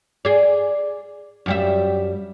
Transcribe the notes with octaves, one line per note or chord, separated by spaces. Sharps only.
G#4 D5
F#2 G3 E5